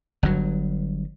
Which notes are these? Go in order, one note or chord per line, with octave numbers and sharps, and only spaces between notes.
G1 G2 F#3